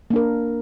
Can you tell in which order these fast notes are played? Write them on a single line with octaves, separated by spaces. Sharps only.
A#3 D4 A#4